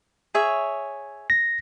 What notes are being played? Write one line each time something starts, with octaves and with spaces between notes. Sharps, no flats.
G#4 C#5 E5
A#6